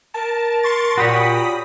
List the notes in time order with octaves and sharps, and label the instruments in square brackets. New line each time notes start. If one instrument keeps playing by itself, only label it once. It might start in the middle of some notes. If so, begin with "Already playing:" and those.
[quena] A#4 [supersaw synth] A5
[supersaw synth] C6 C#6 A6
[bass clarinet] A#2 [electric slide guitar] F#4 G4 C#5 [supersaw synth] B5 D#6